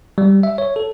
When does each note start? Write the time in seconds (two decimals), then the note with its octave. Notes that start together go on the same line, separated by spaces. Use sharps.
0.18 G3
0.43 E5
0.58 C#5
0.76 A4